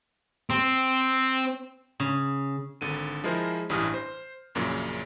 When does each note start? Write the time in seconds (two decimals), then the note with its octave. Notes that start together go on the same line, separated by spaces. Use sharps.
0.50 C4
2.00 C#3
2.81 G#1 D3 D#7
3.24 F3 G#3 E4 A#4 C5
3.70 A1 G2 E3 D#6 F6
3.94 C5
4.55 A#1 F#2 A#2 C#3